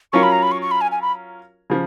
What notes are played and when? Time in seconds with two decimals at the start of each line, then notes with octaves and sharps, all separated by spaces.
0.13 F#3 C#4 F4 A#4 C#6
0.23 B5
0.32 A#5
0.43 B5
0.52 C#6
0.62 C#6
0.71 B5
0.81 G#5
0.91 G#5
1.02 B5
1.70 C#3 F3